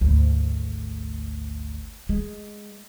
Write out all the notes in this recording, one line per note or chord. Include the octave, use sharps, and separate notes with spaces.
G#1 D2
G#3